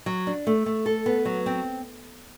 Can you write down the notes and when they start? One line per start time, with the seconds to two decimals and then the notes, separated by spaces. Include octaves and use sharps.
0.06 F#3
0.27 D4
0.47 A3
0.66 A3
0.86 A4
1.06 B3
1.25 F#3
1.46 C4